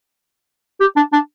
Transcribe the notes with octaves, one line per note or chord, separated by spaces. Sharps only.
G4
D4
D4